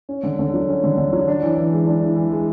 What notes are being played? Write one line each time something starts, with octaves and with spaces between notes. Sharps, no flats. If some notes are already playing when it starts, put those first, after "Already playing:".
C#4
D3
D3
F#3
C#4
D3
D3
F#3
D4
E3
E3
G#3
D4
E3
E3
G#3